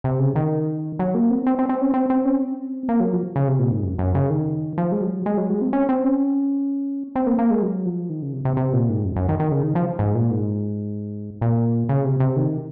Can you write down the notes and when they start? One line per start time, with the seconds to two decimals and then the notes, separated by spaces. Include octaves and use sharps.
0.04 C3
0.19 C#3
0.36 D#3
0.99 F#3
1.14 A#3
1.30 C4
1.47 C4
1.59 C4
1.69 C4
1.81 C#4
1.94 C4
2.10 C4
2.25 C#4
2.41 C4
2.89 A#3
3.00 F#3
3.13 F3
3.36 C#3
3.48 C3
3.59 A#2
3.71 G#2
3.83 F#2
3.98 F#2
4.15 C#3
4.30 D#3
4.78 F3
4.92 G#3
5.01 F#3
5.26 G#3
5.37 F#3
5.50 G#3
5.62 C4
5.73 C#4
5.89 C4
6.04 C#4
7.16 C4
7.27 A#3
7.38 A#3
7.50 G#3
7.62 F#3
7.85 F3
8.10 D#3
8.22 C#3
8.33 C3
8.45 C3
8.57 C3
8.73 A#2
8.89 G#2
9.05 F#2
9.16 F#2
9.29 D#3
9.40 D#3
9.52 C#3
9.63 D#3
9.75 F3
9.99 G#2
10.15 A#2
10.31 G#2
11.41 A#2
11.89 C#3
12.05 C3
12.20 C3
12.36 D#3